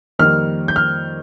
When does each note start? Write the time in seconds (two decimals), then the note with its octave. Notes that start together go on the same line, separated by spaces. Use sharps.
0.19 F2 D#3 G3 A#3 F6
0.68 G6
0.76 F6